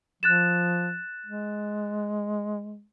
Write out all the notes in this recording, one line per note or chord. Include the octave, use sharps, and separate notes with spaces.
F3 F#6 A6 E7
G#3